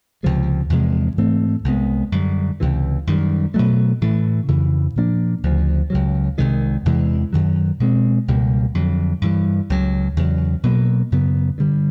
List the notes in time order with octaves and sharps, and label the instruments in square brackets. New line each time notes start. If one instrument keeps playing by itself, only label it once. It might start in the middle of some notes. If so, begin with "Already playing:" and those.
[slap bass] C#2 C3 F3 G#3
E2 C3 F3 G#3
G#2 E3 A3 C4
C2 B2 G#3 B3
F#2 D3 G3
C#2 C3 E3
F#2 D#3 G3
B2 F#3 A3
A2 E3 A3
F2 C#3 E3
A#2 F3 A#3 D4
D2 C#3 F3
C#2 C#3 F#3
C2 C3 D#3 G#3
E2 C3 E3 G#3
F#2 D#3 F#3
B2 G#3 C4
C#2 B2 G3 A#3
F2 D3 F#3
G2 E3 G3
C#2 C#3 F#3
E2 C#3 F#3
B2 F#3 A#3
F#2 C#3 F#3 B3
G2 D3 G3